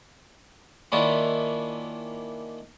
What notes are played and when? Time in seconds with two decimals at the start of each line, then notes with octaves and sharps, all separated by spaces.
0.92 D#3 A#3 C#4 D4 E4 F4